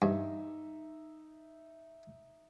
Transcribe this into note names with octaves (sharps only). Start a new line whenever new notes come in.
G2 D#4 E5